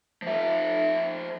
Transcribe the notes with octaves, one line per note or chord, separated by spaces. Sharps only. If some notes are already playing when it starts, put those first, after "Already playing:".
F3 E5